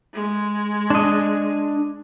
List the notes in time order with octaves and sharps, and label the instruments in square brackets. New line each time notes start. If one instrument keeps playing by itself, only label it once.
[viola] G#3
[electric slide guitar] D4 D#5